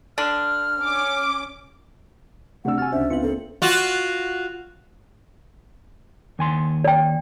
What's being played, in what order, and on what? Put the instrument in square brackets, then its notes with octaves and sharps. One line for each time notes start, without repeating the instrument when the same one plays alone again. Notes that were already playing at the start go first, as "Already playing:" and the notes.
[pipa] D3 D4 [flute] F6
[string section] C#4 D6
[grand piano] C3 E6 [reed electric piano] A3 D4 [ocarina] F#5
[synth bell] F#4 A6 [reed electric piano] G#5 F6
[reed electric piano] C#2 D4 [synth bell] C#4 C5 [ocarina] E5
[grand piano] B3 C4 F4 [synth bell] C#7 F#7
[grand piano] A#3 C4 [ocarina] A4
[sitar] F4 F#4
[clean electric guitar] D#2 G#5 C6
[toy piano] D5 G5